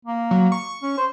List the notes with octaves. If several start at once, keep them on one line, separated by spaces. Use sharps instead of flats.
A#3
F#3
C#6
C#4
C5